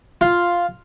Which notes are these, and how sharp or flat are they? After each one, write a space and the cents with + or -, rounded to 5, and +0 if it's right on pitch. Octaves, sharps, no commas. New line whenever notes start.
F4 +0